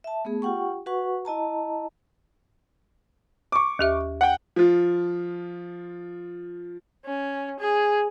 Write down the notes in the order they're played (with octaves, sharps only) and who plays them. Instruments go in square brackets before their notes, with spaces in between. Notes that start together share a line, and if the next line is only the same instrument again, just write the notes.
[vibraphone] E5 A5
A3 B3 G#4
F4 G4 F#5 G5 C#6
F#4 B4 F#5 C#6
E4 D#5 A5 A#5
[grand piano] C#6 D6
[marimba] D#2 G4 E5
[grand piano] F#5 G5
[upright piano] F3 F4
[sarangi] C#4
G#4